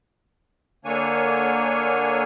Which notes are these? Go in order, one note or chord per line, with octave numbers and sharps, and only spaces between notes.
D3 A#3 D4 C#5 G#5